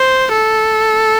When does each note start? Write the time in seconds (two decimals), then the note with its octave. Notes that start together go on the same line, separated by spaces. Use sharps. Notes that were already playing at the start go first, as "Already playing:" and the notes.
Already playing: C5
0.32 A4